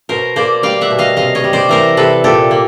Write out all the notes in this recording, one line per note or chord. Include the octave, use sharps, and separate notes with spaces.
B2 A#4 C5
A#3 C5 D5
G3 F5 G5
E5 F#5
B2
D#5 F5
C3 D#5 F5
C#5 D#5
G3
C5 D5
E3 A#4 C5
C3 A4 B4
A#2 G4 A4
A#3